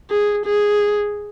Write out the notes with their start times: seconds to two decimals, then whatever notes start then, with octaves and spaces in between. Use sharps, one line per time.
0.10 G#4
0.45 G#4